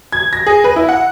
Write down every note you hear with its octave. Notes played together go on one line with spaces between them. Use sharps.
G#6
A#6
G#4
B4
E4
F#5